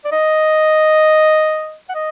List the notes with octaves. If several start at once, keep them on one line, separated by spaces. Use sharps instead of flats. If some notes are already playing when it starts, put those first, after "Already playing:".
D5
D#5
F#5
D#5